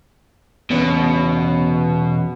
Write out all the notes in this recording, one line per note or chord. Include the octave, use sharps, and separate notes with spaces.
E2 B2 B3 C#4